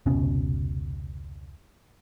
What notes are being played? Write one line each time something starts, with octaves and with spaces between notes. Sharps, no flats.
F1 C#2 B2 C#4